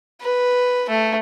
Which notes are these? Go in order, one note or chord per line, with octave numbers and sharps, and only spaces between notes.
B4
A3